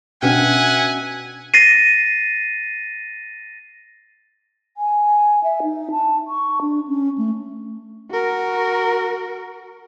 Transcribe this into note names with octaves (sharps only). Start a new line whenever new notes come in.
B2 C#4 D4 B4 E5 F#5 G#5
A6 A#6 C7 D#7
G#5
E5
D#4
A5
C#6
D4
C#4
A3
F#4 A#4